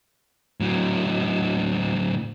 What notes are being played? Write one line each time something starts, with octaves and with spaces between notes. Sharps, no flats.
A2 F#3